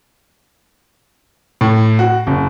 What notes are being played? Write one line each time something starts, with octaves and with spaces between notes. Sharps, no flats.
A2
F#4
F#1